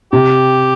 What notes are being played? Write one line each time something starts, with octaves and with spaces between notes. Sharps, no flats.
C3 G4